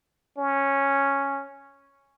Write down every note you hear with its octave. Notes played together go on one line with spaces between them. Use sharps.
C#4